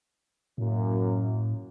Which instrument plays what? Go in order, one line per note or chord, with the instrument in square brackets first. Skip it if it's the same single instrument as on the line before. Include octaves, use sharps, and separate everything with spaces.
[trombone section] F#2 A#3 [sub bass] A2